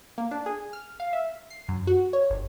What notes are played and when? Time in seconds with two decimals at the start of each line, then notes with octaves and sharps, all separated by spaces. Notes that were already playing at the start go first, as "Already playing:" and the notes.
0.18 A#3
0.31 D4
0.46 G#4
0.73 F6
1.00 F5
1.13 E5
1.50 C7
1.68 F#2
1.87 F#4
2.13 C#5
2.30 G1